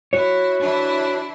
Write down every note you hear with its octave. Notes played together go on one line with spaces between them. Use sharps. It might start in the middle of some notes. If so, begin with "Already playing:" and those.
E4 F#4 C#5
E3 D4 E4